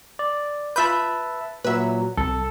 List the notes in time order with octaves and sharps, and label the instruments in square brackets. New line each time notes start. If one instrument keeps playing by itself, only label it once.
[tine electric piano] D5
[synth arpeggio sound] F4 B5 G6 [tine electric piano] B4 E5 A5
[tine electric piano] A#2 F#3 [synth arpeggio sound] B4 E5
[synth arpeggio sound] C2 [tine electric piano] A4